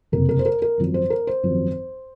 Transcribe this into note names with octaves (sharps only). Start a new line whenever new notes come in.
F#1 F2 C3 A#4
A#4
C5
A#4
A#4
G#1 F#2 F3
C5
A#4
C5
G#1 F#2 F3